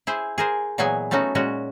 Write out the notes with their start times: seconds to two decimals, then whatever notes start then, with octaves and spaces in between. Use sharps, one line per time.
0.07 E4 G#4 C5
0.38 G#4 A#4 C5
0.78 A#2 E3 F#3 B3 G#4 G#5
1.11 A3 B3 C#4 D#4 F#4
1.35 A#2 G#3 C#4 F#4